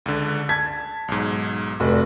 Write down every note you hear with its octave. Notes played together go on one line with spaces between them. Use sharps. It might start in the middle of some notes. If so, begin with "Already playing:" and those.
C#2 D3
A5 G#6 B6
B1 G#2
F1 F#4 B4 D5